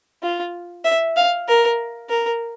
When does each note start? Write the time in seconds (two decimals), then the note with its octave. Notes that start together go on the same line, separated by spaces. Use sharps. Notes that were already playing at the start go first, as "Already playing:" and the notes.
0.23 F4
0.85 E5
1.17 F5
1.48 A#4
2.10 A#4